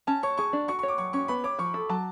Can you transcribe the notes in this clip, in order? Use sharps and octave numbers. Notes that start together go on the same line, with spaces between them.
C#4 A5
C#5 C#6
G#4 C#6
D4
F#4 C#6
C#5 C#6
D6
F#3 C#6
C#4 C#6
B3 B5
C#5 D6
F3 C#6
A4
F#3 A5